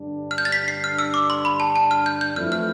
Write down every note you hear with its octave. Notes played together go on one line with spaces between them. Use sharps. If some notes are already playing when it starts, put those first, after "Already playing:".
Already playing: G2 D3 G3 D4
F6
G6
A6
B6
C7
F6
E6
D6
C6
B5
A5
A5
F6
G6
G6
F2 E3 A3 E4 F6
F6